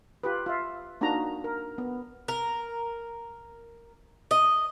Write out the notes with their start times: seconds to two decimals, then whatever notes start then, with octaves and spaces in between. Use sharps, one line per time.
0.24 F4 G4 B4
0.46 F4 E5
1.01 A#3 D4 D#4 F#4 A#5
1.44 A#4
1.78 B3
2.28 A#4
4.31 D#5